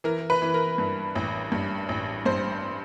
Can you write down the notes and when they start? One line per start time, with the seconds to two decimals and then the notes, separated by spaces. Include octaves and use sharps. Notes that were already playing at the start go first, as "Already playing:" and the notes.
0.04 E3 A#4
0.30 B4
0.42 E3
0.54 A#4
0.78 G2
1.15 A1
1.52 G2
1.89 A1
2.25 G2 C5